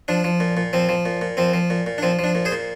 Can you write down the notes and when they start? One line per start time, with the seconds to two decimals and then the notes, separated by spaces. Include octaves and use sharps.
0.08 F3 D4
0.24 F3
0.40 A#2
0.57 A#2
0.73 F3 C4
0.89 F3
1.05 A#2
1.21 A#2
1.37 F3 C4
1.54 F3
1.70 A#2
1.86 A#2
1.98 D4
2.03 F3 C4
2.19 F3 D4
2.35 A#2
2.45 G#4 C5
2.52 A#2